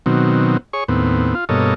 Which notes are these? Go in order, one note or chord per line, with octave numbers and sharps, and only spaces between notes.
B2 D#3 F#3 C4
G#4 C#5 C#6
D#2 A2 B3 C4
F4
G2 B2 A#3 A4 C#5 D#5